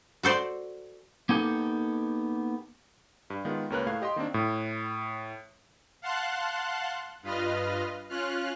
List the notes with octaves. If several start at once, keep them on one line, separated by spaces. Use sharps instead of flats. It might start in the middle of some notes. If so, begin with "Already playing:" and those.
F#4 A4 C5 D5
A#3 B3 D#4 G4 A4 A#4
G2
D#3 G#3 B3 F4
C#2 A#3 C#4 A#4 B4 F#6
A2 A3 F5 G#6
G4 D#5 G5 C6
D#3 A#3 C4 D4
A2
F5 F#5 A5 C6 F#6
G2 F4 B4 D#5 F6
C#4 F4 F6 F#6